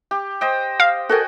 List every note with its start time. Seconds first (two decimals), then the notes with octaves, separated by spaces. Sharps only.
0.11 G4
0.41 C5 D#5 G5
0.80 F5
1.09 F#4 A4 A#4 D#5 G5 G#5